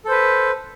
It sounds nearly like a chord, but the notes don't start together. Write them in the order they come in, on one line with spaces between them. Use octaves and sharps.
A4 C5 B4